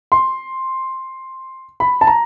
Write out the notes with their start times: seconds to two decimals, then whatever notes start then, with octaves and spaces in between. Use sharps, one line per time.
0.12 C6
1.80 B5
2.01 A5
2.07 A#5